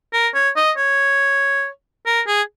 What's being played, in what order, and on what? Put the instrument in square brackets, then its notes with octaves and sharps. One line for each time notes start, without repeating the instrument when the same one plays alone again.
[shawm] A#4
C#5
D#5
C#5
A#4
G#4